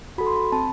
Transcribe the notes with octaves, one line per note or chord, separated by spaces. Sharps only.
F#4 A4 B5
C6
B5
C4 A5